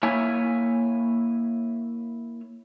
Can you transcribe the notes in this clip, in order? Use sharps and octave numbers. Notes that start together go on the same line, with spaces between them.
A#3 E4 C#5 E5 G#5